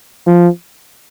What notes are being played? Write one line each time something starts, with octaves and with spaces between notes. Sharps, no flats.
F3